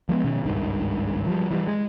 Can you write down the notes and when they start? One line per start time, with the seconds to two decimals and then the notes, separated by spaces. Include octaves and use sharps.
0.09 F3 G#3 A3 B3
0.24 B2 D#3 C#4
0.44 G#1 C#2 G2 D#3
1.27 F3 G3
1.51 E3 G3
1.67 G#3